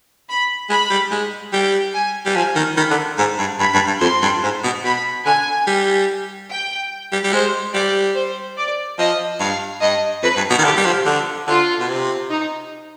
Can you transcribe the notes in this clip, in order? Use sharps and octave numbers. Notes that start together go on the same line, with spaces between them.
B5
G#3 B5
G3
G#3
G3 G5
G#5
G3
F3 G#5
D#3
D#3 B5
D3
G#2
G2
G2 B5
G2
G2
F2 C6
G2
G#2
B2
B2 B5
D3 G#5
G3
G5
G3
G3
G#3 C5
G3 D5
C5
D5
F3 D#5
G2 F5
G2 D#5
F2 B4
G2
B2
D#3
D3 G4
G3
F3
D3
D3 F4
B2
C3
D#4